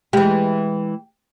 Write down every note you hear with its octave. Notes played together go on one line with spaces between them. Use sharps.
E3 G#3 G4